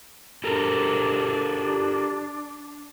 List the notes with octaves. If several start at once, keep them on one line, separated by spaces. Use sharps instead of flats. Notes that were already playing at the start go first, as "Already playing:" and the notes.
D4 G4 A4 A#4